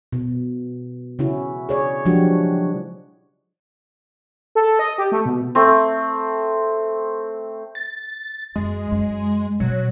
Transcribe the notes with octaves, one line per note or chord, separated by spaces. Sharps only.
B2
C#3 C#4 E4 F#4
G#4 C#5 D5
F3 F#3 G#3 D4 F#4 G4
A4
D#5
G4
A3
B2
A3 C4
A6
F#2 G#3
F#2
B2 F#3